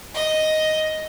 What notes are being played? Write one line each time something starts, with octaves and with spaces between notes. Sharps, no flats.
D#5